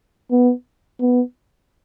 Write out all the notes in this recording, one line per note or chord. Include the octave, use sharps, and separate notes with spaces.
B3
B3